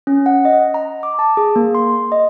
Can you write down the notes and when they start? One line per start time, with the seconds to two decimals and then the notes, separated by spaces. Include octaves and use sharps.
0.07 C#4
0.26 F#5
0.45 D#5
0.74 A#5
1.03 D6
1.19 A5
1.37 G#4
1.56 A#3
1.75 C6
2.12 D#5